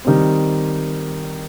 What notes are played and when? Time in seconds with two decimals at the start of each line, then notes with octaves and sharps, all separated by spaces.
0.05 D#3 G3 C4